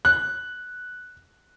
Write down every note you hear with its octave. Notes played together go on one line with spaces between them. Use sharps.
F#6